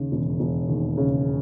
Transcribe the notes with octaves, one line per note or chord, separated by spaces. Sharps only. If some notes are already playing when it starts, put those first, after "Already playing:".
Already playing: D#2 C#3
E1
E1
D#2
C#3